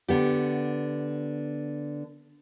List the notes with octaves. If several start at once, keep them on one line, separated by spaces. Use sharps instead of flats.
D3 B3 G4